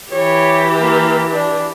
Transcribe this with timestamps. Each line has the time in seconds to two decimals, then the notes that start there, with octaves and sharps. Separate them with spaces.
0.12 E3 G4 C#5
0.80 A#3
1.32 D4